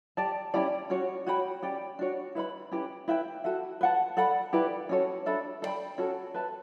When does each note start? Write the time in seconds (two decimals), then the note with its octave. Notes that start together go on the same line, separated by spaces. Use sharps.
0.17 G4 D5 A5
0.54 C#4 E4 G4 D5
0.90 C#4 F#4 C#5
1.26 F#4 C#5 G5 B5
1.63 C#4 G4 D5 G5
1.99 D4 F#4 C#5
2.35 E4 B4 E5 B5
2.71 C#4 E4 G4 B4
3.08 E4 B4 E5 G5
3.44 F#4 A4 E5
3.81 B4 F#5 A5
4.17 A4 D5 F#5 B5
4.53 E4 G4 B4 D5
4.89 C#4 F#4 A4 C#5
5.26 D4 A4 E5 B5
5.62 A4 D5 G5 B5
5.98 C#4 F#4 A4
6.34 B4 E5 A5